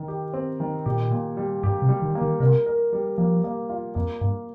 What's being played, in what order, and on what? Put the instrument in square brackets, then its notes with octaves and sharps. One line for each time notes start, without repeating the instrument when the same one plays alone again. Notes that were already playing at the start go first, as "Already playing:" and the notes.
Already playing: [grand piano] D#3
G4
C4
D#3
[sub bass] A#2 [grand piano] G4
[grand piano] A#2
G3
[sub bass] G2 [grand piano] G4
[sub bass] C3
[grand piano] G3
[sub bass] D#3
[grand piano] A#3
[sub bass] D#3
[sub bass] C3 [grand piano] A#4
[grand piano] A#4
G3
[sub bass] F3 [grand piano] A#3
[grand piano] A#3
F4
[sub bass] F2 [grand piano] A#3
[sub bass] G2 [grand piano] A#3